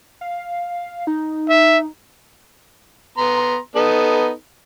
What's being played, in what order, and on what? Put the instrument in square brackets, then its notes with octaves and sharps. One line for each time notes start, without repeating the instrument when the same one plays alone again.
[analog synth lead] F5
D#4
[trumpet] E5
[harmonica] B3 A#5 C6
B3 D#4 A4